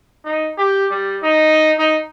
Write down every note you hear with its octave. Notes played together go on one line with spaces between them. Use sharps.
D#4
G4
G3
D#4
D#4